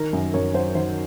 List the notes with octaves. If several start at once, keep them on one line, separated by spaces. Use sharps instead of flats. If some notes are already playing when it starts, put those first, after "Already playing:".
Already playing: D#3 A#4
F#2
F#2 A#4 C#5
F#3 C5
D#3 C5